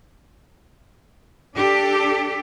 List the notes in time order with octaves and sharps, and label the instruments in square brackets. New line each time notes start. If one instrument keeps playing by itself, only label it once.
[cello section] D4 G4 A4